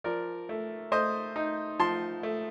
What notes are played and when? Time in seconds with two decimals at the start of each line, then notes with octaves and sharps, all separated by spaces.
0.04 F3 A#4 D5
0.49 A3
0.92 A3 C5 D#5
1.36 D#4
1.79 F3 A5 C6
2.23 A3